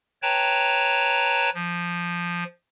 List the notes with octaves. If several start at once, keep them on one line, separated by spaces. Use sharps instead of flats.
B4 C#5 G5 A5 A#5
F3